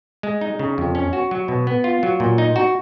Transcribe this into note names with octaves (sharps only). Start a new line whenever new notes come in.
G#3
D#4
C#3
F2
C#4
F#4
F#3
B2
B3
F4
F#3
A#2
D#4
F#4